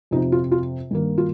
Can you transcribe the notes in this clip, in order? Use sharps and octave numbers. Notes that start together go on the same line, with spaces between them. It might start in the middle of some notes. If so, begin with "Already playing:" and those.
F2 C3 F3 D#4
F4
F4
G2 D#3 A#3
F4